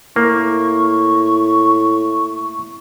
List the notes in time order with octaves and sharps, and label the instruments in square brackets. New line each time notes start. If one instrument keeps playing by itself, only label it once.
[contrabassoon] A2 [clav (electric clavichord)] A#3 [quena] C#6